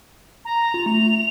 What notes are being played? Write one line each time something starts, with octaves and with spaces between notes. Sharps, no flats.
A#5
F4 F7
A3 F7